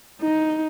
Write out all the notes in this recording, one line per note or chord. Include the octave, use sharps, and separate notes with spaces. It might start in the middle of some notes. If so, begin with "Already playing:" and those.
D#4